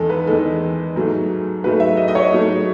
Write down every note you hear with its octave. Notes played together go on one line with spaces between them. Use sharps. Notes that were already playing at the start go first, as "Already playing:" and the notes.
Already playing: E2 D#3 G#3 A4
B4
E2 D#3 G#3 A4
G#2 F#3 A3
G#2 F#3 A3 B4
E5
D#5
D#5
C#5
G#2 F#3 A3